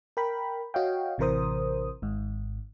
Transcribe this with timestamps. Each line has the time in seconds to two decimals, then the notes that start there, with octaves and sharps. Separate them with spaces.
0.17 A#4 G5 B5
0.74 F#4 C#5 D#5 F5 G5
1.18 A1 C3 E3 A#4 C5 D#6
2.02 G#1 G#2